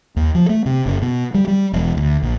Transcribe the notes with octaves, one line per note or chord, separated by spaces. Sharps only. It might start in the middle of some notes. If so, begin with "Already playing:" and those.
D#2
F3
A3
C3
F#1
B2
G3
G3
E1
D2
A#1